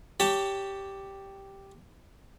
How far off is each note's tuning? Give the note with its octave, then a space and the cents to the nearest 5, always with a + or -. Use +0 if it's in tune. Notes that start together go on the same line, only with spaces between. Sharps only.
G4 +0 C#5 +20 A5 +20